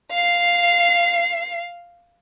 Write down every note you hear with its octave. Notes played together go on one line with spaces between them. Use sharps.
F5 C7